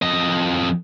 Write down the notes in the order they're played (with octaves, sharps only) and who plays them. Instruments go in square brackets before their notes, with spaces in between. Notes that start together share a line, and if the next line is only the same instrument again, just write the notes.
[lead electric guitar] F2 D#5